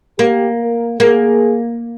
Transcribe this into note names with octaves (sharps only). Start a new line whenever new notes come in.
A#3 G4
A#4
A#3 G#4